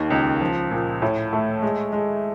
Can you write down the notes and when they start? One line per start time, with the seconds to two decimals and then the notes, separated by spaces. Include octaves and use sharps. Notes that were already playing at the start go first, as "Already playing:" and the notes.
Already playing: D#2 D#3 A#3
0.10 C#2
0.41 F3
0.71 A#2
1.02 A2
1.33 A3
1.62 G#3
1.93 G#3